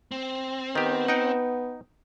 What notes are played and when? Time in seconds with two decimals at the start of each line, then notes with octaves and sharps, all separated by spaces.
0.11 C4
0.75 D#3 B3 G4
1.08 D#4 F#5 G5